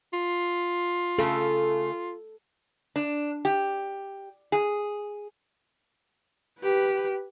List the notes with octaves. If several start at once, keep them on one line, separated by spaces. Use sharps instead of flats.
F4
C#3 A3 A4
D4
G4
G#4
G4 B4